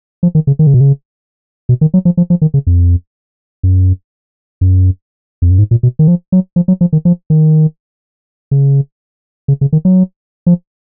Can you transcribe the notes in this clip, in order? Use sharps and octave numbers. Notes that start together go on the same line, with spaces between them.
F3
D#3
C#3
D#3
C#3
B2
C#3
B2
D#3
F#3
F3
F3
F3
D#3
C#3
F2
F#2
F#2
F2
F#2
G#2
A#2
B2
D#3
F3
F#3
F3
F#3
F3
D#3
F3
D#3
C#3
C#3
C#3
D#3
F#3
F3